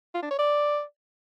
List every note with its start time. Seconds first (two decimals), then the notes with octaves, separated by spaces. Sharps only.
0.14 F4
0.22 D4
0.30 C#5
0.38 D5